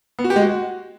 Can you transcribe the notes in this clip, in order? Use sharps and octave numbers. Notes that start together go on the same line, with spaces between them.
B3
F#4
G4
G#3
F#4